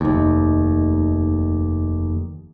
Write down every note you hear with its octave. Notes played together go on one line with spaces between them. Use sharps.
F1 D#2